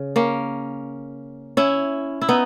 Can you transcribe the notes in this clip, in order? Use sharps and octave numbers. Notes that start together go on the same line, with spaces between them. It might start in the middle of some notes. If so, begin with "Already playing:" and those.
Already playing: C#3
A#3 C#4
C#4 E4
E4
B3 D#4